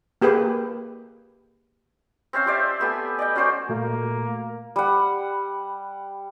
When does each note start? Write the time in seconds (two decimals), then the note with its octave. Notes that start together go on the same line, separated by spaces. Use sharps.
0.21 A#3 G4 G#4 B4
2.33 C4 C#4 C5 F5
2.46 G4 C5 D5 E5
2.80 A3 B3 G4 G#5
3.19 D5 D#5 G5
3.36 C#4 F#4 C5 D5
3.69 A#2 A3 A#3 F#4
4.76 G3 F#5